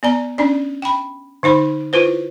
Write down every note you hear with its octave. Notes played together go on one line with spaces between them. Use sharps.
B3 D5 A#5
C#4 D4 D5
G5 B5
D3 D#4 C5 B5
E4 F4 B4 C5